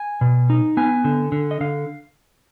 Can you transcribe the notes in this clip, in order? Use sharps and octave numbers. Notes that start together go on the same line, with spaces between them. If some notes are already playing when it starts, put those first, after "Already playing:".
Already playing: G#5
B2
D#4
B3 G#5
D3
D3
D#5
D3 F5